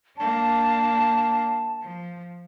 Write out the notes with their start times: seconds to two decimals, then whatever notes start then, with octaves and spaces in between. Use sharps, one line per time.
0.17 A#3 D4 A5
1.82 F3